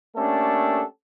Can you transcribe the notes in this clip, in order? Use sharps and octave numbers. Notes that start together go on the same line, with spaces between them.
A3 A#3 C#4 D4 G4 A4